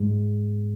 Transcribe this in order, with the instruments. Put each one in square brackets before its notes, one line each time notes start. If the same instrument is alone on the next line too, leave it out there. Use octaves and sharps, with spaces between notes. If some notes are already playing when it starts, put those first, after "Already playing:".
Already playing: [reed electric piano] G#2 G#3